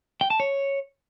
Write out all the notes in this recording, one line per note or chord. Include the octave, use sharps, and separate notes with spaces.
G5
A5
C#5